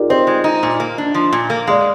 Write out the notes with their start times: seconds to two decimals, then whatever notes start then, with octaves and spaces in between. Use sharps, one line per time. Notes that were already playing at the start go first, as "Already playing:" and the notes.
Already playing: D#4 F4 G4 G#4 A#4 D5
0.10 C4 C5 D#5
0.27 G#3
0.44 D#4
0.63 A#2
0.80 A#3
0.98 D4
1.15 F3
1.33 A#2
1.50 A#3
1.67 G#3 D5 F5